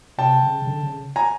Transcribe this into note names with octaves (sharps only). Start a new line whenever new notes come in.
C3 G5 A5
C#3
C#3
D3
C#3
G#5 A#5